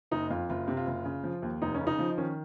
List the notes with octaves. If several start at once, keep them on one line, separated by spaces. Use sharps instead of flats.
F#1 D#4
F2 F4
F#1 F4
C3
F4
F#1
C#3
F3
D#2
F1 D#4
C#4
C#3
D#4
F3
D#3 C#4